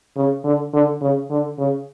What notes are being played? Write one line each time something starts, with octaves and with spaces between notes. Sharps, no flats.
C#3
D3
D3
C#3
D3
C#3